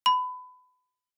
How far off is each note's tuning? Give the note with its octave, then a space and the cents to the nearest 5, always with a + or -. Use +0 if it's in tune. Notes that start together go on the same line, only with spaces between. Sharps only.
B5 +25